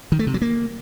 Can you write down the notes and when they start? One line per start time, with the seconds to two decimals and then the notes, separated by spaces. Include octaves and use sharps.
0.12 D#3
0.19 A3
0.27 C3
0.34 F#3
0.42 A#3